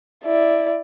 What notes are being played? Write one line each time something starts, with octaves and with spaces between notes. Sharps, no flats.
E4 D5